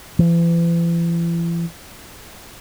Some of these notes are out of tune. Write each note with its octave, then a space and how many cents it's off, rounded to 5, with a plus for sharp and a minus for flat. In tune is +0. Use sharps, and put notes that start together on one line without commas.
E3 +40